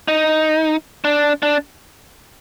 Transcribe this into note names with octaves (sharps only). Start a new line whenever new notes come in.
D#4
D4
D4